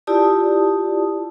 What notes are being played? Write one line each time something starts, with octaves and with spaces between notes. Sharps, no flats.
E4 F4 G4 D5 A5 D#6